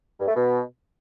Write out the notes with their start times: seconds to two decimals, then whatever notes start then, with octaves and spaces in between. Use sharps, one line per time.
0.20 G2
0.28 A3
0.36 B2